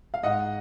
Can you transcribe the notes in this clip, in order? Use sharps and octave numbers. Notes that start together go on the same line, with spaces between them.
F5
G#2 D#5 F#5